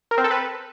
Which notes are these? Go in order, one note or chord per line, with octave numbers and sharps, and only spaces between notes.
A#4
C4
A4
B4